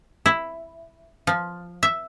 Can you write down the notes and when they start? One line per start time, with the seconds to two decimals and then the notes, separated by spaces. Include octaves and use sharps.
0.26 E4
1.27 F3
1.83 E5